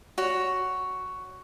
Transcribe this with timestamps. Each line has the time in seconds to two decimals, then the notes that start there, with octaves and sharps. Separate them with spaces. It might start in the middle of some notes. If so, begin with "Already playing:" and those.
0.18 F#4 C#5